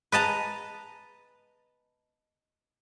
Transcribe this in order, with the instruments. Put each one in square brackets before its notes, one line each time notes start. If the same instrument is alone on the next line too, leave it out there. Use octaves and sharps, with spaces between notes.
[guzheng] B4 D#5 A5 A#5